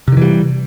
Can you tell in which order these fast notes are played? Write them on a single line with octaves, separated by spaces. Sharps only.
C3 D#3 E3 G3